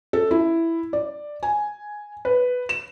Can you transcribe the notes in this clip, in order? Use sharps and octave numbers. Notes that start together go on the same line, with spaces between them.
A4
E4
D5
G#5
B4
E7